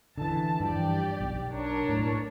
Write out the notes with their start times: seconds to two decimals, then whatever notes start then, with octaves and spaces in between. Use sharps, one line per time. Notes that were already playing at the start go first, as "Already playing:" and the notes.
0.18 D3 E3 A5
0.60 G2 E3 F3 G4 D5
1.20 B1
1.51 D4 A#4 C#5
1.89 A2